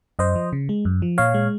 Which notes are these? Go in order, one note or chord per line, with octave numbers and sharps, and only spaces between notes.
F#2 C5 D#5
F3
C#3
G#3
F#2
F3
A#2 C#5 F5
G#3